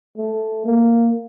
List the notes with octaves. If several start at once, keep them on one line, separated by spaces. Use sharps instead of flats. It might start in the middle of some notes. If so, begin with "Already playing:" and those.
A3
A#3